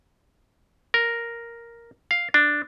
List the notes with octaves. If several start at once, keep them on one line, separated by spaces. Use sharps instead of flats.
A#4
F5
D4